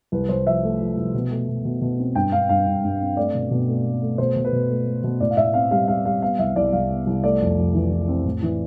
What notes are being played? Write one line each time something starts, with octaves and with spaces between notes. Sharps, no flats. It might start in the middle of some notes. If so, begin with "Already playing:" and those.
C2 B4
C2 C5
F3 E5
A3
F3
C2
B2
A3
B2
B2
B2
C4
G2 G5
G2 F5
G2 F5
G2
G2
C4
A3 D5
B2
B2
A3
A3
A3
B2 C5
B2
B4
B2
A3
A3
B2
A2 D5
F5
A2 E5
C4 F5
G3 F5
G3 F5
G3 F5
B3 F5
C2 E5
C2 D5
C2 F5
B3
C2
A3 D5
F2
F2
E3
E3
C4
A2
E3